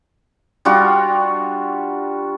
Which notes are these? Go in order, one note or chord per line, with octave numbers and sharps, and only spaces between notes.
G3 D4 F4 F#4